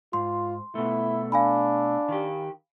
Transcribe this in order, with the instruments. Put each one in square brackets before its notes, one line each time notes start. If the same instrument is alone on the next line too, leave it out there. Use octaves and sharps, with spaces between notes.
[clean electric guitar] G#2 [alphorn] F4 [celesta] C6
[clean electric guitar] B2 A3 [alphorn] E4
[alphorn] D4 [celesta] F5 G#5 B5
[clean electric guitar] D#3 G4